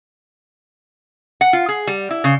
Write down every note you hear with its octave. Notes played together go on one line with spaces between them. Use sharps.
F#5
F4
G#4
G3
E4
C#3